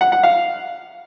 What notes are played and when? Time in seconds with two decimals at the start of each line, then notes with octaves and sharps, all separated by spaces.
0.01 F#5
0.12 F#5
0.23 F5